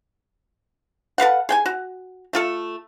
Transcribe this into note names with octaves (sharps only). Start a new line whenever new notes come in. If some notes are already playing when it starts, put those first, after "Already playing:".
A4 B4 F5 F#5
G#4 G5 G#5
F#4
A3 F4 A4